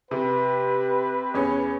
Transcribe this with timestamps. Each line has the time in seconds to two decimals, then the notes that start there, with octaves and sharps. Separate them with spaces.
0.11 C3 B4
1.34 E2 C#4 C#5